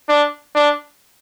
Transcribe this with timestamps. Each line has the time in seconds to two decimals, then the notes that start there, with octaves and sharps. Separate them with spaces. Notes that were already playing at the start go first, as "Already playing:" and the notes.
0.09 D4
0.55 D4